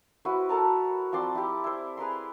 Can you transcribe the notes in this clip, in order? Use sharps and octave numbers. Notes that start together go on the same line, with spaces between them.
E4 F#4 B4 C5
A4 A#4 A5 A#5
F3 C4 D5 C6
E4 G4
E4 C5
G#4 B4 A#5 C6